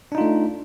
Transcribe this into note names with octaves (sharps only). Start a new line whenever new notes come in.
A3 D4 D#4 F4